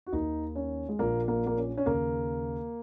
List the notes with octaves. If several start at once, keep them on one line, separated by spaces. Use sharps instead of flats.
F#4
D#2 D#3 D#4
C#4
G#3
A#1 A#2 A#3
A#3
A#3
C#4
C#4
D#2 C#3 A#3